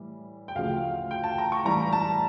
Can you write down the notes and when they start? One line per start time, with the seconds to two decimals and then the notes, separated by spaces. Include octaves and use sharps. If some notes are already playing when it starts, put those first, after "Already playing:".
Already playing: A2 E3 G3
0.48 G5
0.55 D2 C#3 F3 A3 F5
1.11 G5
1.24 A5
1.38 A#5
1.52 C#6
1.65 A2 E3 G3 A#5
1.93 A5